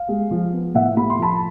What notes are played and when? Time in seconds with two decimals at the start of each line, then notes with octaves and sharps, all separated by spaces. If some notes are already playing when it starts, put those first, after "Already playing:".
Already playing: F5
0.08 G#3
0.31 F3
0.53 B3
0.75 A2 E5 F#5
0.97 A3 B5
1.10 C6
1.19 F3 A5 B5